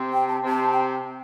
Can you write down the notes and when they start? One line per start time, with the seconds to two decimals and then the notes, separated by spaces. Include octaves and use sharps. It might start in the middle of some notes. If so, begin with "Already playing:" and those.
Already playing: C3 C4
0.13 G5
0.29 A5
0.43 C3 C4 A5
0.72 G5